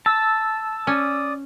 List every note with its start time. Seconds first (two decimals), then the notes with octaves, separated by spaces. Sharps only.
0.06 A5 E6
0.87 C#4 D5 D#6